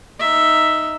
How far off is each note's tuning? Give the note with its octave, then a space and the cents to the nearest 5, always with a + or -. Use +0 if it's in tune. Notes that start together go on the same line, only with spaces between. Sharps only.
D#4 +0 E5 +0